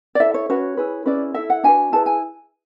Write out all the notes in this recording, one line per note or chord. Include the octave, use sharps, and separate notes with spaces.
D5
E4 A4 E5
C#5
C#4 F#4 B4 C#5
E4 G#4 B4
C#4 E4 G#4 B4 D5
E4 A4 E5
F#5
D4 F#4 B4 G#5
E4 G#4 B4 A5
G#5